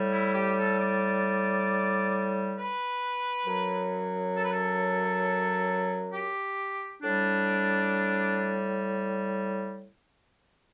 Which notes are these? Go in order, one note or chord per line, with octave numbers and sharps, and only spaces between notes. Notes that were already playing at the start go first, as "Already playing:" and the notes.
Already playing: A2 G3
E4
G4
A4
D5
B4
F#2 F#3
A4
B4
A4
G4
A2 G3 D4